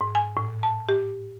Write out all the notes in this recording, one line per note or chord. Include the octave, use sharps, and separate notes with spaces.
G#2
G#5
A2
A5
G4